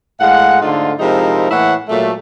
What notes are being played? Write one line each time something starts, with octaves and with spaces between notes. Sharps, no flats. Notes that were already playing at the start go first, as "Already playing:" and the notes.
A2 G#3 F5 F#5
G#2 D3 A3 D#4 F4
C3 F3 G#3 D#4 E4 A#4
A2 E3 A#3 E4 C#5 F#5
A#2 F#3 G#3 A3